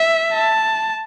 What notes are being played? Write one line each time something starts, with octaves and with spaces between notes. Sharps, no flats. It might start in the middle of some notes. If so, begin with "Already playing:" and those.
Already playing: E5
A5